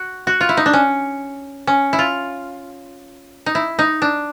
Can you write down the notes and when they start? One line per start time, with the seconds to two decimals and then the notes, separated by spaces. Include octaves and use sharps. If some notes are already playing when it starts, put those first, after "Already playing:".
Already playing: F#4
0.27 F#4
0.41 F4
0.49 E4
0.57 D#4
0.66 D4
0.73 C#4
1.67 C#4
1.93 E4
1.99 F4
3.46 D#4
3.55 E4
3.79 D#4
4.02 D4